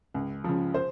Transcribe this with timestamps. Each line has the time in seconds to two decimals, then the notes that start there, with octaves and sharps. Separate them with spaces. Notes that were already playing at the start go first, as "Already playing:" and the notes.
0.14 C#2
0.44 C#3 F3
0.74 C5